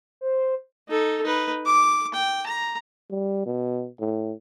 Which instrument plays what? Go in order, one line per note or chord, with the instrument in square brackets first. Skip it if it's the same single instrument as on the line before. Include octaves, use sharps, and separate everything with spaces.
[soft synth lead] C5
[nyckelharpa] D#4 A4
D#4 B4
D6
G5
A#5
[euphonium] G3
B2
A2